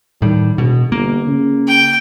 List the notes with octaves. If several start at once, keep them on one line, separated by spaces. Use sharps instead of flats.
A2 D#3 G3
E1 B2
G1 A#3
C#3
G5